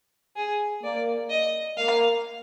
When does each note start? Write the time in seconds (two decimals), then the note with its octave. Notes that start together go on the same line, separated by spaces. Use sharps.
0.36 G#4
0.83 A#3 D5
1.30 D#5
1.77 A#3 F5